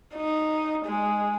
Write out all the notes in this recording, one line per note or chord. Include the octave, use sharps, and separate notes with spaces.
D#4
G#3